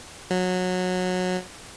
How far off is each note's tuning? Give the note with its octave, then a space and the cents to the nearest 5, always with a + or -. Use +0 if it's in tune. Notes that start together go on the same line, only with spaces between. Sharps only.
F#3 -20